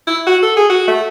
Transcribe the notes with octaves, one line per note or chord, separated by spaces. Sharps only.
E4
F#4
A4
G#4
F#4
A3